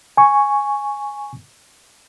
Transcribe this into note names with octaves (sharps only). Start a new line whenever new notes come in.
G#5 C#6